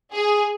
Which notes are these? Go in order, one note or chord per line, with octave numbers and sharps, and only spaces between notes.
G#4